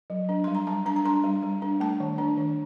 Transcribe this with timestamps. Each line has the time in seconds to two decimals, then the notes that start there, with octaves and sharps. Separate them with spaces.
0.10 F#3
0.29 D4
0.44 G3 C6
0.55 A#5
0.67 G3 A5
0.86 D4 A#5
0.96 A#5
1.05 D4 C6
1.24 G3
1.43 G3
1.62 D4
1.80 A3 A5
2.00 D#3
2.18 D4
2.38 D#3